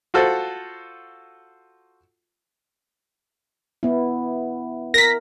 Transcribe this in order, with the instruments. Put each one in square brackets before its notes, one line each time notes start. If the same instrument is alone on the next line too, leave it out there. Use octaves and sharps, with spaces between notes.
[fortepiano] F4 F#4 A4 C5
[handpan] B3 E4
[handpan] A#4 [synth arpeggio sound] A#6 B6